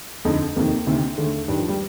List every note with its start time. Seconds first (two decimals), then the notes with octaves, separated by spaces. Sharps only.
0.25 F2 D3 D#4
0.56 F2 C3 D#3 A#3
0.87 D2 C3 D#3
1.18 D#2 D3 A3
1.48 G2 D#3 G3
1.59 F3
1.69 G3